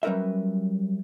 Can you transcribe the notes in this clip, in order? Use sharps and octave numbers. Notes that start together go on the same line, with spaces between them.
F#3 G3 C#4 A#4 B4 E5